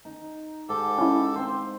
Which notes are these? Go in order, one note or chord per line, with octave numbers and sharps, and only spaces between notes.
D#4
G#2 G4 A4
C#4 E4
C4 C5